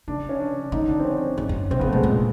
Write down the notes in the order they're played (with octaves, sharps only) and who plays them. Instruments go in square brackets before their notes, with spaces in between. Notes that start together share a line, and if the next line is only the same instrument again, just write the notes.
[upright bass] C#3 [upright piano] D4
[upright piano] C#4
D4
[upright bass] D3 [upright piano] D#4
[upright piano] D4
C4
C#4
[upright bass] G#2
F#2
[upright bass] B2 [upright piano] C4
[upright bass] C#3 [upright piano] B3
[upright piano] A3
[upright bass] B2 [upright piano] G#3
[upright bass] A#2